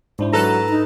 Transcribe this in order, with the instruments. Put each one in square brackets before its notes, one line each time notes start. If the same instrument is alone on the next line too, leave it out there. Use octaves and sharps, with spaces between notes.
[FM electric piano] G#2 D4 E4 [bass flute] C5
[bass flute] F#3 [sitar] A4 B4 [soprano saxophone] A#5
[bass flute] D#4